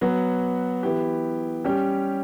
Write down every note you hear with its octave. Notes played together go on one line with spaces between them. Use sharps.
F#3 B3 F#4
E3 B3 E4 G4
G3 C#4 G4